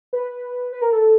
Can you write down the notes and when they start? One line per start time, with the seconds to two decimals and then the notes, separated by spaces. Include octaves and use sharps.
0.13 B4
0.72 B4
0.82 A#4
0.93 A4